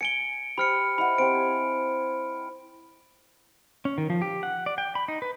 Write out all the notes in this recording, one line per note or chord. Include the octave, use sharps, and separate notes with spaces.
G#5 C#7 D7 G7
G4 C5 B5 F6 C#7
E4 D#5 F#5 B5
C4 G4 D7
G#5
C#4
D#3
F3
G4
F#5
D5
G5
B5
D#4
B4